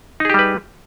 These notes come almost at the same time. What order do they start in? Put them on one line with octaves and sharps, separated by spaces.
D#4 G#4 G4 G3 B4